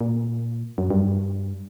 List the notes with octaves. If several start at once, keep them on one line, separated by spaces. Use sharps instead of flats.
A#2
F#2
G2